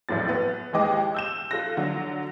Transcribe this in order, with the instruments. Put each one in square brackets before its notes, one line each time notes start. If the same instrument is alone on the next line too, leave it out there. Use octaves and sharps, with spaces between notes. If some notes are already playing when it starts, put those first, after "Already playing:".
[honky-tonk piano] A1 E2 A2 F#3 A6
B3
D#2 E3 G#3 G4 D#5 D6
E6 G6 E7
F4 A4 F#6 A#6
D3 F#3